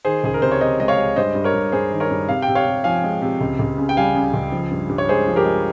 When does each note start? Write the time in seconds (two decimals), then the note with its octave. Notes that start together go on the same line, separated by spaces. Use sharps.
0.05 D#3 G#4 C5
0.24 C#2 G#4
0.34 A#4
0.42 C3 C5
0.51 C#5
0.61 C3 C5 D#5
0.80 G#3 D#5
0.88 C#5 F5
0.98 G#3
1.16 G2 C5 D#5
1.35 G2
1.44 A#4 C#5
1.54 G2
1.72 G2 G#4 C5
1.92 D#3
2.00 A#4 C#5
2.11 G2
2.29 C3 F5
2.42 G5
2.48 C3
2.55 C#5 F5
2.66 C3
2.84 F3 F5 G#5
3.04 G#3
3.22 C3
3.41 C#2
3.59 C#2
3.78 C#3
3.89 G5
3.97 G3 F5 G#5
4.15 C#3
4.34 C#2
4.52 F3
4.71 G2
4.89 G2
4.98 C#5
5.09 G#3 G#4 C5
5.27 F3
5.36 G4 A#4
5.45 G#3